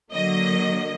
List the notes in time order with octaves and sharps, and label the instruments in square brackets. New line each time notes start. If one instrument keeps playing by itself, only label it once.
[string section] D3 F#3 A#3 D#5